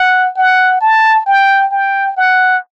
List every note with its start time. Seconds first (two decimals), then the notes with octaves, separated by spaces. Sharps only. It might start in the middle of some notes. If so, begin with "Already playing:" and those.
Already playing: F#5
0.36 F#5
0.81 A5
1.26 G5
1.72 G5
2.17 F#5